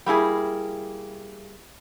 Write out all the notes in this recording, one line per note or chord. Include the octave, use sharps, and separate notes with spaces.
G3 A#3 E4 G#4